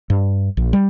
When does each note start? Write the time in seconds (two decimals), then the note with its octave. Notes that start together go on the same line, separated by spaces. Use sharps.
0.10 G2
0.57 A#1
0.73 G3